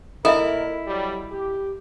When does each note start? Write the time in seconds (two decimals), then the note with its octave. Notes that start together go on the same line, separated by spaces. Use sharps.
0.25 A#2 E4 A4 A#4 D#5 E5
0.87 F#3 G3
1.32 G4